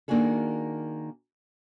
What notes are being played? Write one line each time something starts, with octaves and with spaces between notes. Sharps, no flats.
D#3 A#3 D4 F#4 G#4 A4